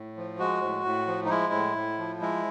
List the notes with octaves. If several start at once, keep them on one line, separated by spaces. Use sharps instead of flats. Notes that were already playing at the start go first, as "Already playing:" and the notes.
Already playing: A2
F3
G#3 F#4
A2
A2
F3
D#4
G#3 E4
A2
A2
F3
G#3 E4